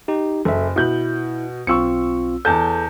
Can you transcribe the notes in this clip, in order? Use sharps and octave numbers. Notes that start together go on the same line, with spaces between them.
D#4 G4
F#1 A4 E5
B2 E4 G6 F#7
B1 C4 F4 C#6 E6 C#7
E2 A4 A5 G6